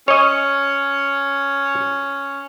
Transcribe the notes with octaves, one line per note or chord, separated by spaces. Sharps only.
C#4 C#5 D#5